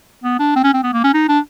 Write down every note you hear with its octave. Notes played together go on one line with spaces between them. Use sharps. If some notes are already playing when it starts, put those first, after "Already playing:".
B3
D4
C4
C#4
C4
B3
A#3
C#4
D#4
D4